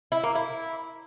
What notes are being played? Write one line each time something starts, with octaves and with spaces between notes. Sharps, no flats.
E4
A#3
E4